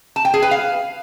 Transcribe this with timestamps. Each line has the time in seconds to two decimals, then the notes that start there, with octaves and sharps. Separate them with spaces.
0.16 A5
0.25 G5
0.34 G#4
0.42 B4
0.51 F5